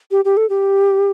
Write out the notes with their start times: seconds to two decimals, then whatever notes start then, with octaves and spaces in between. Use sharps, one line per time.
0.11 G4
0.25 G4
0.37 A4
0.49 G4